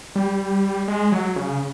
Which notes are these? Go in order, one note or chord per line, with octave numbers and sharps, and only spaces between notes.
G3
G#3
F#3
C#3